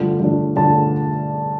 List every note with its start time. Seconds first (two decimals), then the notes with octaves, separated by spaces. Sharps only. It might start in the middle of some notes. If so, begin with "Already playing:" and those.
Already playing: G2 D3 F3 A3 D4
0.19 G2 D3 F3 A3 D4
0.56 G2 D3 F3 A3 D4 A5